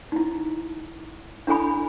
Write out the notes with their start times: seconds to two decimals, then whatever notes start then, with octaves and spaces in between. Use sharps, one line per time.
0.12 D#4 E4
1.47 D4 E4 A4 G#5 B5